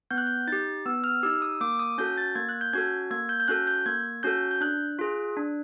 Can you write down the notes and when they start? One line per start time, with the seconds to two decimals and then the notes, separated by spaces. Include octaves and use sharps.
0.11 B3 G6
0.18 F#6
0.27 G6
0.47 D#4 G4 A6
0.86 B3 E6
1.04 F6
1.23 D#4 G4 E6
1.42 D#6
1.61 A#3 D6
1.79 D#6
1.98 C#4 F#4 A4 G6
2.17 A6
2.35 A#3 G#6
2.49 F#6
2.61 G6
2.73 C#4 F#4 A4 G#6
3.11 A#3 G#6
3.29 G6
3.40 G6
3.48 C#4 F#4 A4 F#6
3.67 G6
3.86 A#3 G#6
4.23 C#4 F#4 A4 G6
4.51 G6
4.61 D4 F#6
4.99 F4 G#4
5.37 D4